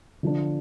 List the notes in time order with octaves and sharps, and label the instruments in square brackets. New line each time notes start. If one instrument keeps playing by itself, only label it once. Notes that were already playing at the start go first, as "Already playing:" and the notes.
[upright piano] D3 F3 D4